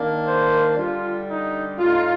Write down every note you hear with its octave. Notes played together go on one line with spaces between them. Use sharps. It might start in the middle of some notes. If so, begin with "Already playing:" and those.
Already playing: D#3 A#3 D4
C5
D3 G3 D4 F4
D#4
A2 A3 D#4 F4